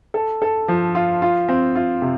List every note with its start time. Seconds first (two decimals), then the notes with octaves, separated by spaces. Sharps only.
0.14 A4
0.42 A4
0.68 F3
0.95 F4
1.22 F4
1.48 C4
1.76 F4
2.02 C3